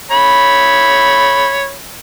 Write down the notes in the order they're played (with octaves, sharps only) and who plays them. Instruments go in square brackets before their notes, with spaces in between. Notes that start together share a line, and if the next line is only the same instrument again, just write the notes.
[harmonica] C#5 B5